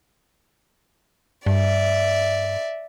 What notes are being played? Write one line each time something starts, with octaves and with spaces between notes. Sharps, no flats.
G2 D5 E5